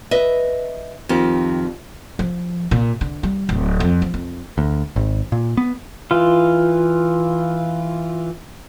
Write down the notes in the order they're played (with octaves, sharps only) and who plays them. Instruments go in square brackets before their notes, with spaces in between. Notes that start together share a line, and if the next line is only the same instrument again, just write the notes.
[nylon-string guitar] B4 D#5 E5
F2 D#3 G4
[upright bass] F3
A#2
D3
G3
D1
F2
F3
F2
[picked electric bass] D2
G#1
A#2
B3
[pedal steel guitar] E3 F4